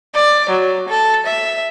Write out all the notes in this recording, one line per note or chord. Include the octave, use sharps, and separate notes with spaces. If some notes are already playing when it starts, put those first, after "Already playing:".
D5
F#3
A4
E5